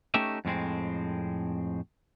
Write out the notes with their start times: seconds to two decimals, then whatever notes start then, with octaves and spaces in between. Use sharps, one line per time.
0.14 A3 C#4 D#4 G4 E5
0.45 F2 A2 G#3 C4